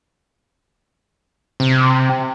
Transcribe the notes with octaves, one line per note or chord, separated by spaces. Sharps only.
C3